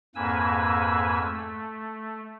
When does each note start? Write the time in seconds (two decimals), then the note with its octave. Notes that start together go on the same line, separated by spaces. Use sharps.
0.15 F2 G#2 A#3 B4 G#5 E6
1.22 A3